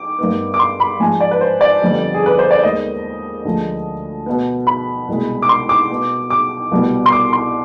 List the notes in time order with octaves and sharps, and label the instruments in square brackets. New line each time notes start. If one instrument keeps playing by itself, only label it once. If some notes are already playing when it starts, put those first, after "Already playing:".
Already playing: [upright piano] D6
G2 D#3 B3
D6
C6
B5
G#2 F3 G#3 G#5
D5
B4
C5
D5
F2 D3 G3 B3
G#4
B4
C5
D5
D#2 D#3 G#3 B3 D#5
D2 D3 F3 G#3
B2 B3
B5
C2 B2 G#3
D6
C6
D6
B2 B3
D6
C2 B2 G3 B3
C6
D6
C6